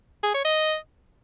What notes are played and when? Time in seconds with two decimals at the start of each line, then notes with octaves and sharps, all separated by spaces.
0.23 G#4
0.34 C#5
0.45 D#5